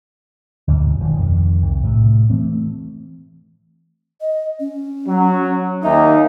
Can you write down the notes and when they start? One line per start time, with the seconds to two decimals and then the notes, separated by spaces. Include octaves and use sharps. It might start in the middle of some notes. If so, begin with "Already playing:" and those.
0.68 D2 G#2 B2
1.00 E1 D#3 F3
1.16 F2 D#3
1.62 C2
1.83 A2 C3
2.30 E3 A3 C4
4.21 D#5
4.60 C#4
5.08 F#3
5.83 D#2 D#4 E5